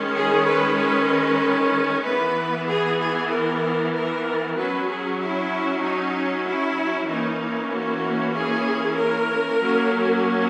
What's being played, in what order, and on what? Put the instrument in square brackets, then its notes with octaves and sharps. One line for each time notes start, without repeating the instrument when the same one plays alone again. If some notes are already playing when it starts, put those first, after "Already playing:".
Already playing: [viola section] D#3 G#3 C#4
G#4
B4
B4
E3 B3 B4
G#4
G#4
A#4
A#4
F#3 C#4 B4
G#4
E4
D#4
E4
E3 A#3 C#4 D#4
F#4
G#4
A#4
F#3 A#3 C#4